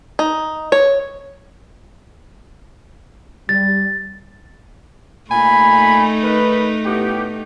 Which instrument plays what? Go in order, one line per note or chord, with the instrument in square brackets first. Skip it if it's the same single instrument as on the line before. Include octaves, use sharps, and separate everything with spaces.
[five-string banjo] D#4
C#5
[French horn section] G3 [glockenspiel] A6
[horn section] A#2 G#5 B5 [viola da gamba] A3 D#4
[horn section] D#3 B4
A2 B3 G4